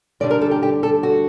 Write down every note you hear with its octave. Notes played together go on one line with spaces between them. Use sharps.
G2 D3 G3 D4 D5
A#4
A4
G4
G4
A4
F#4